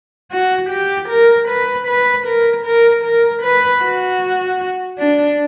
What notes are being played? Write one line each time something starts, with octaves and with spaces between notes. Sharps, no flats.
F#4
G4
A#4
B4
B4
A#4
A#4
A#4
B4
F#4
D4